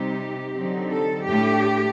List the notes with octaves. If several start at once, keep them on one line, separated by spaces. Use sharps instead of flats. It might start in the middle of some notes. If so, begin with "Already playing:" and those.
Already playing: C3 G3 C4 D#4 G4
D3 F#3 C4 D#4
A4
A2 A3 D4 G4